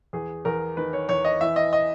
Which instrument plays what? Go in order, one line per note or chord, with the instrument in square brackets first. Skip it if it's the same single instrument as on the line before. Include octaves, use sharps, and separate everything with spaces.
[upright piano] E2 G#4
E2 A#4
D#3 B4
C#5
E2 C#5
D#5
E3 E5
D#5
D#5